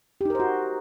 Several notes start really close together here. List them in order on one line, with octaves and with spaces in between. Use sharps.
G4 D#4 A#4 C5 F#4